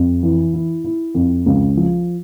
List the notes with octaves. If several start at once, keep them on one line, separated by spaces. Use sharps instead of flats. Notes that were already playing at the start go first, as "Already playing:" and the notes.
Already playing: F2
E3
E4
E4
F2
C#2
F3